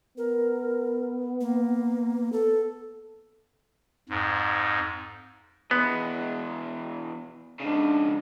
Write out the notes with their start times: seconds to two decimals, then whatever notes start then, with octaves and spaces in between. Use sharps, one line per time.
0.18 B3 A#4
1.41 A#3
2.32 A4
4.09 F2 G#2
5.71 E2 G#3 B3
7.60 G#2 C#3 D4